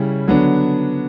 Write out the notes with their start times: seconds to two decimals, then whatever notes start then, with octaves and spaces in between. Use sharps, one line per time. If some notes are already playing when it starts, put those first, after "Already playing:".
Already playing: C#3 G3 C#4 E4
0.27 D3 F#3 B3 D4